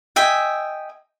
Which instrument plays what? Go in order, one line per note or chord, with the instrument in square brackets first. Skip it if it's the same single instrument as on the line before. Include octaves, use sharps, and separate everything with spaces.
[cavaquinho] D#5 E5 G5 G#5